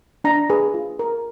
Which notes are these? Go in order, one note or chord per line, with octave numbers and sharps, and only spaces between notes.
D4 A#5
G#4 B4
F4
A#4